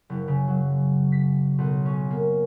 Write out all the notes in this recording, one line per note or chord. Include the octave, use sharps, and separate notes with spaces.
F#1
C#3
F#3
B6
B1
C#4
A#3